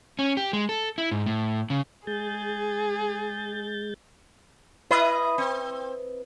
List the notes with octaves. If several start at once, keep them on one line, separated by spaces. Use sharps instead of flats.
C#4
G4
G#3
A4
E4
G#2
A2
C#3
G#3 G#4 G6 A6
E4 B4 D#5
C4